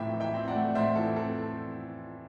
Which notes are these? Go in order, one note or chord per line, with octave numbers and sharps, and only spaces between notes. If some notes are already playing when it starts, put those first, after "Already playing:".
Already playing: A2 E3 A3 C4 E5 G5 B5 D6
E3
E5 G5
C4
D5 F#5
A3
A2 C5 E5
E3 A4
C4 A4